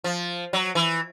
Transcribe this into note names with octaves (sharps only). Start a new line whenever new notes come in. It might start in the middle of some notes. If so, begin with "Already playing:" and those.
F3
F#3
E3